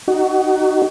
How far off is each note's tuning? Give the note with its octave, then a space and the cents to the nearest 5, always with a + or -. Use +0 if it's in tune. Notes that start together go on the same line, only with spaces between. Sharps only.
D#4 -5 F#4 +25